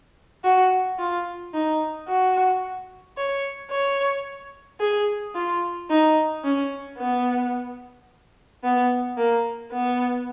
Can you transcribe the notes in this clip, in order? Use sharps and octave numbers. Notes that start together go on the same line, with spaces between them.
F#4
F4
D#4
F#4
C#5
C#5
G#4
F4
D#4
C#4
B3
B3
A#3
B3